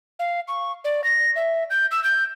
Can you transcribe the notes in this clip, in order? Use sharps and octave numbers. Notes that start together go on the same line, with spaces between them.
F5
C#6
D5
A#6
E5
G6
E6
G6